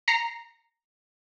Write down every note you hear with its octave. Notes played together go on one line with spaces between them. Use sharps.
A#5 A#6 C7 C#7